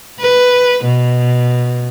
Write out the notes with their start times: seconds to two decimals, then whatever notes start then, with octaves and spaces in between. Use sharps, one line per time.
0.20 B4
0.84 B2